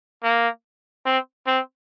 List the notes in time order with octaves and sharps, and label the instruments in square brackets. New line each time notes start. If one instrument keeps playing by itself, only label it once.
[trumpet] A#3
C4
C4